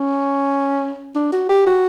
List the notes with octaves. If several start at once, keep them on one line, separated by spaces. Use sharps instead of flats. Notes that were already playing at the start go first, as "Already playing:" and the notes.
Already playing: C#4
D4
F#4
G4
F#4